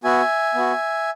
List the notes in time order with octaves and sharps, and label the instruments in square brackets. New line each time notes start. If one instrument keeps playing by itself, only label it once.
[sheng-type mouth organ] B3 F#4 E5 G#5
B3 F#4